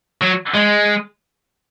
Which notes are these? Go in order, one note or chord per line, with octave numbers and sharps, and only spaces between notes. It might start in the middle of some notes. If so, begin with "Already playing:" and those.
F#3
G#3